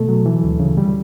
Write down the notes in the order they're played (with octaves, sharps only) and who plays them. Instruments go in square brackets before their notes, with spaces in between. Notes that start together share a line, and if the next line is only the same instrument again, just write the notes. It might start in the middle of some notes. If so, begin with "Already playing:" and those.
Already playing: [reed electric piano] B2 A3 A4
F#3
E3
D2
C#3
G3